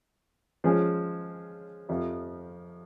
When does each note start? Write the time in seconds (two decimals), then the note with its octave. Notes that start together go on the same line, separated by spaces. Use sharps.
0.64 F3 G#3 C#4 G#4
1.89 F2 C3 F3